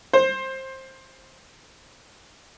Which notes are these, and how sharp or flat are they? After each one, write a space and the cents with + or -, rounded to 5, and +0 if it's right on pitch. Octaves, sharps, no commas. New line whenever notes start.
C5 +15